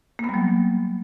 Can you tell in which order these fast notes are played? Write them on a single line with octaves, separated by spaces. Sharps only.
A#3 B3 G3 F#3